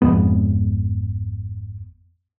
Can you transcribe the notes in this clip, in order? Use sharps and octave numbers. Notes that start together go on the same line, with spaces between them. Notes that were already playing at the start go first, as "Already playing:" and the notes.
G#1 F2 G#3 B3